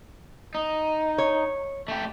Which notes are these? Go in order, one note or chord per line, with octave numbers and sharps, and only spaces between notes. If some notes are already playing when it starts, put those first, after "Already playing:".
D#4
C#5
A3 G4